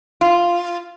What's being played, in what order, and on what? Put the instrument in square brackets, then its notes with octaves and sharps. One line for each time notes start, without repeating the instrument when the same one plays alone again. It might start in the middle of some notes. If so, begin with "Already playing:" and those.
[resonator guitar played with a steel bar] F4